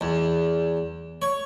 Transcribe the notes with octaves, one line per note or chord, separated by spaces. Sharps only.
E2
C#5